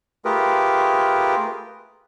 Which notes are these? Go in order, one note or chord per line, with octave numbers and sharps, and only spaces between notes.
A3 F4 G4 G#4 A#4 B4